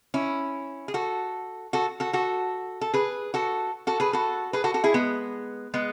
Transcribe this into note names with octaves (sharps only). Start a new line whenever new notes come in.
C#4 E4
G#4
F#4 A4
F#4 A4
F#4 A4
F#4 A4
A4
G#4 B4
F#4 A4
F#4 A4
G#4 B4
F#4 A4
G#4 B4
F#4 A4
F#4 A4
E4 G#4
G#3 B3
G#3 B3